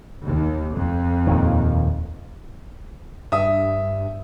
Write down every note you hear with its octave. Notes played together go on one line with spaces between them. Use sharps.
D#2
F2
D#2 A#2 D#3
G2 E5 D#6